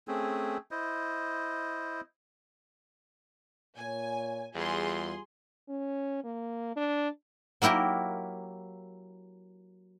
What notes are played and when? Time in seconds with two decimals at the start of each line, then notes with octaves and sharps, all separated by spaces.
0.08 A3 C4 C#4 G#4
0.71 E4 C5 D#5
3.77 A#2 C#5 G#5
4.55 E2 G3 F4 G#4 C6
5.69 C#4
6.24 A#3
6.76 D4
7.62 F#3 A#3 E4 G4 A#4